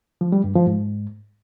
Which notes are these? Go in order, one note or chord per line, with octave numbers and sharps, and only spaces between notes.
F3
G3
G2
F3
G#2